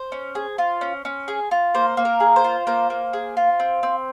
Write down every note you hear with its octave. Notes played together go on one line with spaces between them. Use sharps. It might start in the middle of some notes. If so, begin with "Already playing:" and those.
Already playing: C5
C#4
G#4
F4
C#4
C#4
G#4
F4
A#3 C5
A#3
A#4
G#4
C5
F4
A#3 C5
A#3
G#4
F4
C4
C4